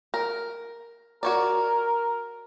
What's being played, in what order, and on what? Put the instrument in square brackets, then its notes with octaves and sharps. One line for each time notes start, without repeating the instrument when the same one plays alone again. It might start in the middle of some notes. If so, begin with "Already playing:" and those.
[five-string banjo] A#4
[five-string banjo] F#4 C#5 D5 [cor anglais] A#4